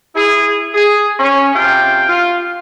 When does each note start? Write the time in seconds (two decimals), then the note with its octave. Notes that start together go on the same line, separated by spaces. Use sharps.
0.15 E4 G#4
0.74 G#4
1.19 C#4
1.54 C3 F4 G5
2.09 F4